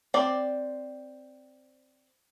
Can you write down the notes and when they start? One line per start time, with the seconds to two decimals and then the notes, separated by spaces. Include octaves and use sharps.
0.14 C4 D5